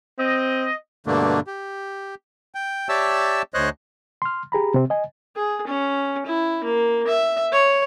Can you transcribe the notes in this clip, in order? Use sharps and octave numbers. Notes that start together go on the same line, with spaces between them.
C4 D#5
G2 B2 D3 A3 A#3 D4
G4
G5
G4 C#5 D5 E5 A5 E6
D2 C5 C#5 D#5 F#6
C6 F6
G4 G#4 A#5 B5
C3 C4
D#5 G#5
G#4
C#4
E4
A#3
E5
C#5